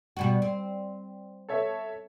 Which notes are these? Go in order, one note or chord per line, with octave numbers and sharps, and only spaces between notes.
B2 G3 F#4
C4
A4 C#5 E5